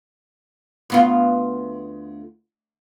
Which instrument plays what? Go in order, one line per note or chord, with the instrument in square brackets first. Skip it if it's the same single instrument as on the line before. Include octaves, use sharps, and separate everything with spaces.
[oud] D2 B3 F4